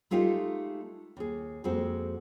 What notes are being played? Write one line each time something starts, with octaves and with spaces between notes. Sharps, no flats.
G#3 A3 D#4 F4 G4 D#5
D#2 G#4
F2 G#3 A#3 C4 F#4